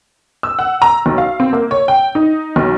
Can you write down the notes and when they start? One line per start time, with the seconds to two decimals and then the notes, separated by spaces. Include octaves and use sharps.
0.43 E6
0.59 F#5
0.82 A#5
1.06 B1
1.18 F5
1.40 C4
1.53 A#3
1.71 C#5
1.88 G5
2.15 D#4
2.56 B1